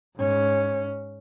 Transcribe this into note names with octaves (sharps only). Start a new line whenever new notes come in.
G#2 C#4